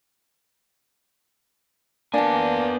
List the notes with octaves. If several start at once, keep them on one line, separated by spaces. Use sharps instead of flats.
A#3 B3 D4 D5 G#5 A5